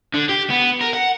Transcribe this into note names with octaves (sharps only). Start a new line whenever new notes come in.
D3
G4
B3
A#4
F#5